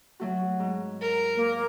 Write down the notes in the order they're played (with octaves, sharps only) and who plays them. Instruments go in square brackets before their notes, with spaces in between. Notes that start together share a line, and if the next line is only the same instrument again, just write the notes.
[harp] F#3 A3 F#4
G#2
[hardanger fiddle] A#4
[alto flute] A#3